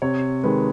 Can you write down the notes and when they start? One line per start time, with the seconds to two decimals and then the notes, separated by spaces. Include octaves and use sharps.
0.02 C3 C#5
0.44 D#3 G#3 B4